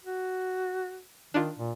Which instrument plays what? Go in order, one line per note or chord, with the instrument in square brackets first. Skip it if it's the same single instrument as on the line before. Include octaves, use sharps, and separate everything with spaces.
[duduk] F#4
[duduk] D#3 [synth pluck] D4 D#4 F4
[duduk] A#2